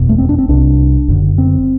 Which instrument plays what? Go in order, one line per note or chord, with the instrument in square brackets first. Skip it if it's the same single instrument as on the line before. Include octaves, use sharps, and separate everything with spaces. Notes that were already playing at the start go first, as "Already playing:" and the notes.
Already playing: [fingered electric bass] F#1 E2 B2
A3
C4
D4
C4
C2 C3 D4
F#1 F#2 D3
C4